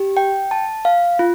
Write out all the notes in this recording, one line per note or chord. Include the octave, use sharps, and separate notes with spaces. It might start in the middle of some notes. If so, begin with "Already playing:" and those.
Already playing: G4
G5
A5
F5
F4